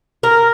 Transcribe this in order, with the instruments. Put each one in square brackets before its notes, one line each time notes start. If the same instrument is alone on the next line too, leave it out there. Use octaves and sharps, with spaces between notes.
[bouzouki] A#4